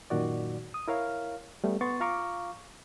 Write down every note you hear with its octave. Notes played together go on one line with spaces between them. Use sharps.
F#2 A#2 D#3 F#4 D5
D#6
E4 A#4 C#5 F5
G3 A3 B3
B3 C6 C#6 A6
F4 F5 A#5 C#6 D6